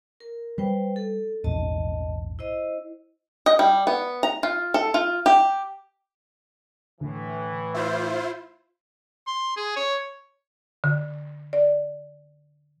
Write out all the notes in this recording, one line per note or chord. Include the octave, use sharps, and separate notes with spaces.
A#4
G3 B4 C5 G5
A4
A#1 E2 G#2 D#5 A5
E4 C5 D#5
D#5
G3
B3
A#5
F4
A4
F4
G4
A2 D3 E3
E4 F4 C5 E5 G6
C6
G#4
C#5
D3
D5